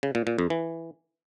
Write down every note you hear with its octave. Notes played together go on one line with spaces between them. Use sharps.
C#3
A#2
A#2
F2
E3